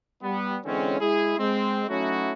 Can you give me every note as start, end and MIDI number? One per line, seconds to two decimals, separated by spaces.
0.22 0.58 55
0.22 0.58 59
0.65 0.96 50
0.65 0.96 52
0.65 0.96 56
0.65 0.96 60
0.65 0.96 61
1.00 1.38 56
1.00 1.38 64
1.00 1.38 68
1.38 1.84 56
1.38 1.84 60
1.89 2.33 54
1.89 2.33 57
1.89 2.33 61
1.89 2.33 63
1.89 2.33 64
1.89 2.33 66